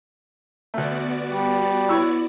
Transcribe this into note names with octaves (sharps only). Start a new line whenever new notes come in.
D2 A3 B3 F#4 D5
G3
E4 C#5 C#6 E6